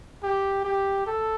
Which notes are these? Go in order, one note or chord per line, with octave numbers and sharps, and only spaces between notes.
G4
G4
A4